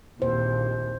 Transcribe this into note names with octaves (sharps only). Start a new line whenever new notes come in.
A#1 D#2 A#2 E4 C5